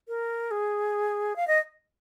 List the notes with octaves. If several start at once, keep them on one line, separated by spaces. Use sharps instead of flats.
A#4
G#4
F5
D#5